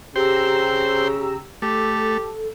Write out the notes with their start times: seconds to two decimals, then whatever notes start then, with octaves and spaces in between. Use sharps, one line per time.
0.16 C#3 G4 C5 G5 A#5 E6
1.62 A3 G4 A4